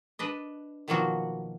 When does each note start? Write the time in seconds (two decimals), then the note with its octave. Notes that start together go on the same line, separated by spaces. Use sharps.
0.19 D4 B4 D#5
0.88 B2 D#3 F3 F#3 A#3 F#4